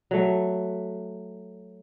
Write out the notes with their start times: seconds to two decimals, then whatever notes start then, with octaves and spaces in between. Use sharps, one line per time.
0.11 F#3 A3